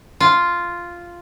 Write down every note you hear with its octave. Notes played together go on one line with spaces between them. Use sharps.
F4